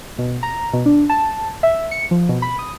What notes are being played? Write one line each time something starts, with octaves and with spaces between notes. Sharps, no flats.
B2
A#5
B2
D4
A5
E5
C#7
F3
B2
B5
D#6